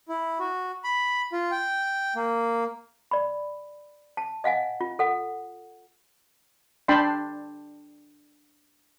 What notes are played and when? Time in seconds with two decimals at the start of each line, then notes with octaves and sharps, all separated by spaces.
0.09 E4
0.39 F#4
0.84 B5
1.32 F4
1.51 G5
2.16 A#3
3.11 D5 B5
4.17 A5
4.44 D#5 F5 F#5 G#5
4.81 F4
4.99 A4 F#5
6.88 D4 G5 A5 B5 C6